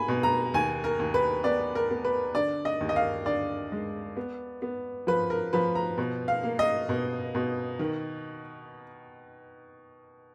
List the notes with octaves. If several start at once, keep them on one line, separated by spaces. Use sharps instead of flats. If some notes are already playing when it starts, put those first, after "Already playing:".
Already playing: A#3 G#5 B5
B2
A#5
D#2 G#5
A#4
D#2
B4
B3 D5
A#4
B3
B4
D3 D5
D#5
D#2
D#5
F5
D3 D5
G#3
B3
B3
F3 B4
A#4
F3 B4
A#5
B2
F5
A#3
D#5
B2
B2
D#3